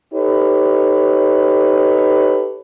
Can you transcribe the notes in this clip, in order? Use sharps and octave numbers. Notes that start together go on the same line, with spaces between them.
D#4 G4 A4 B4 C#5